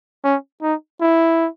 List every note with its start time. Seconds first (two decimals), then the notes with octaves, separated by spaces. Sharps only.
0.24 C#4
0.62 D#4
1.01 E4